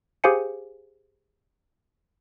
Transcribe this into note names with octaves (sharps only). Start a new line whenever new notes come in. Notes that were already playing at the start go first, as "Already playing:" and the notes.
G4 G#4 C5 F5 G#5 C#7